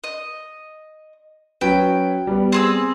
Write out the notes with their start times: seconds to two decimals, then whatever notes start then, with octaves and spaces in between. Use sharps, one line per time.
0.04 D#5
1.61 F#3 C#4 B4 G5
2.27 G3 B3
2.52 C4 G#4 E6